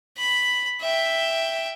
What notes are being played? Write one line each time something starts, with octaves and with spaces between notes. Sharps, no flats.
B5
E5 G5